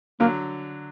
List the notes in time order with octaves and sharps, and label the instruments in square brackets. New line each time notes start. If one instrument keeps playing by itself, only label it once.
[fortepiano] D3 F#3 [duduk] A#3